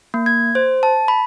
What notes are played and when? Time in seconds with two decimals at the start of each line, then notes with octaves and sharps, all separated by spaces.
0.14 A#3
0.26 G#6
0.55 C5
0.83 A5
1.08 B5